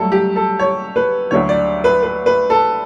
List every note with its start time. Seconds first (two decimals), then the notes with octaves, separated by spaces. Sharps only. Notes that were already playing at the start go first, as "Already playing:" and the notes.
Already playing: G2 F#3 A3 A4
0.12 G4
0.36 A4
0.59 C#5
0.96 B4
1.31 D2 D3 F#3 C#5
1.49 D5
1.84 B4
2.03 B4
2.26 B4
2.50 A4